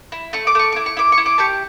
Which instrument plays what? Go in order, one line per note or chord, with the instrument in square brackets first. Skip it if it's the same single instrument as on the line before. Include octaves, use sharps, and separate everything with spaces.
[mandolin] E4
A3 C#6
D6
A3 C#6
E4 D6
C#6
E4 D6
C#6
E4
D6
G4 A5 C#6